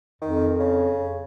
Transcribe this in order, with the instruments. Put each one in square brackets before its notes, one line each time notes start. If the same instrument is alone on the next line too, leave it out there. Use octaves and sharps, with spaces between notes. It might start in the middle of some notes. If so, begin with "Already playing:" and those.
[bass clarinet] F2 [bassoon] D#3
[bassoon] C#3